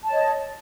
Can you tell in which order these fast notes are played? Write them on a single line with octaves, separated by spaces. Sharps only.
A5 C#5 D#5